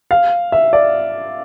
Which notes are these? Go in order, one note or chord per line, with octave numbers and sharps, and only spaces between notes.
F5
E5
D5